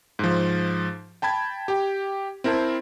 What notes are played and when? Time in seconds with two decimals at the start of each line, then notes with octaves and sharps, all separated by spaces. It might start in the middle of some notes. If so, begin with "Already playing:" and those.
0.19 G#2 F3
1.22 G5 A5 B5 G#6
1.68 G4 G5
2.44 C4 E4 A#4 C5 A5